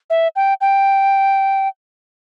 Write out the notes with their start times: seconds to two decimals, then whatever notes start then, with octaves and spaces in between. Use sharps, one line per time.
0.10 E5
0.36 G5
0.61 G5